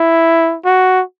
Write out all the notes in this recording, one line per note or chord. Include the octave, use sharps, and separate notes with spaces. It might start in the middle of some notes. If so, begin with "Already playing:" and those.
Already playing: E4
F#4